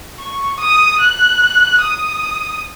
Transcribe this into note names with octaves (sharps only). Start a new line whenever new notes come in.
C#6
D#6
F#6
D#6